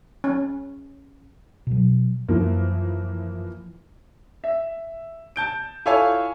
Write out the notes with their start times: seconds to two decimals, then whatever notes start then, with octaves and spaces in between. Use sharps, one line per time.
0.24 C#4
1.67 B2 F#3
2.28 F#2 E3 F3 A#3
4.44 E5
5.36 A5 G6 D7
5.86 E4 F4 A4 C#5 F5 G#5